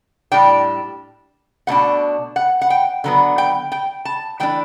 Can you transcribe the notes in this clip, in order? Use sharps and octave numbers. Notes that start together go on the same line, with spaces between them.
A2 G3 D4 G5
B2 A3 D4 F#5
F#5
F#5
G5
D3 F#3 B3
G5
G5
A5
E3 A3 D4 G5